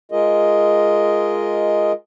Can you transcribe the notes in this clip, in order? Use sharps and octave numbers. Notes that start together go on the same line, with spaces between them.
G#3 F4 G#4 A#4 D#5